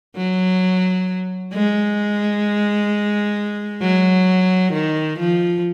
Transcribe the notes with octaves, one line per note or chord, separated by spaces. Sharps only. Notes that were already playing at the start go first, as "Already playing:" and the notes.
F#3
G#3
F#3
D#3
F3